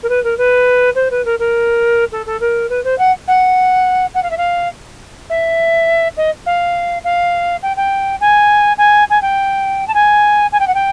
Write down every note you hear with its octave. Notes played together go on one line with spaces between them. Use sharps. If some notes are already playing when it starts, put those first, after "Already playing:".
A#4
B4
A#4
B4
C5
B4
A#4
A#4
A4
A4
A#4
B4
C5
F#5
F#5
F#5
F5
E5
F5
E5
D#5
F5
F5
G5
G5
G#5
G#5
G#5
G5
A5
G#5
G#5
G5
F#5
G5